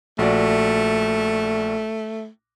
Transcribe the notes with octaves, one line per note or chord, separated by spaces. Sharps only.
A#1 A3 F#4 D5